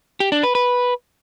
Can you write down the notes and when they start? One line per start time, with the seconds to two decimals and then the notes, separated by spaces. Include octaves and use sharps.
0.20 G4
0.32 D4
0.43 B4
0.55 B4